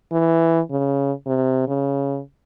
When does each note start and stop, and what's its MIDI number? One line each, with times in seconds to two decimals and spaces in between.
0.12 0.60 52
0.71 1.12 49
1.27 1.65 48
1.68 2.20 49